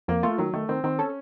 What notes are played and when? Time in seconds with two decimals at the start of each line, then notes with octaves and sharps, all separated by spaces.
0.08 F2 A#3
0.23 A3 F4
0.38 D#3 F#3
0.54 D#3 A3
0.69 D#3 C4
0.84 D#3 C4
0.99 C#4 A4